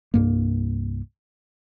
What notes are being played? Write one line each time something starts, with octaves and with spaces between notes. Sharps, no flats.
C2 G2 A#3